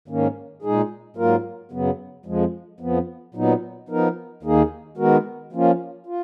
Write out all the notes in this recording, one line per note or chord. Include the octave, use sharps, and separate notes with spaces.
G#2 D#3 A#3 C#4
A#2 G#3 D#4 G#4
G#2 F#3 A#3 F4 A#4
F#2 C#3 F#3 B3
F2 F3 G#3
F2 F3 B3
A#2 F#3 B3 D#4
F3 B3 D#4 A#4
D#2 D#3 A#3 D#4 G#4
D#3 G#3 B3 F#4 A#4
F3 A#3 C#4 F4
F4